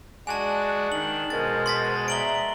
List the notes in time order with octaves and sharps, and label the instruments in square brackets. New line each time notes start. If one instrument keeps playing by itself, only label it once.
[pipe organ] G#3 D4 F#4 [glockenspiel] G#5 A5
[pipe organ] D#3 D4 [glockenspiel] F#7
[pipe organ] B2 G#3 [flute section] A#4 C5 D#5 [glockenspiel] A6
[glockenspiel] C6 A6 B6
[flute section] D5 E5 A#5 [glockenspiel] D7 F#7 G7